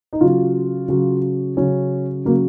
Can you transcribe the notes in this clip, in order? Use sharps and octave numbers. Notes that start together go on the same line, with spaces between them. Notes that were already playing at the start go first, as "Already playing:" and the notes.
D#4
C#3 F#3 F4
C#3 F#3
C#3 F#3 C#4
C#3 F#3 A#3